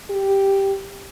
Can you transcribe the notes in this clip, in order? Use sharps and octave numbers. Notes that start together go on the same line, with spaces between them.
G4